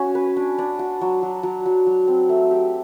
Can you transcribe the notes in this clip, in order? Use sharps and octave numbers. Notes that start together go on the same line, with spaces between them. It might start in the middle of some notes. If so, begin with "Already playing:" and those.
Already playing: C#4 F#4
B4
D4
D4
F#4
F#3
F#3
F#3
F#3
F#3
C4
A3
G4